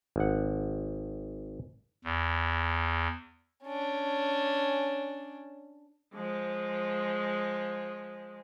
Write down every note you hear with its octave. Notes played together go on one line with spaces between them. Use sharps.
G#1 F#5
E2
C#4 D4
F3 G#3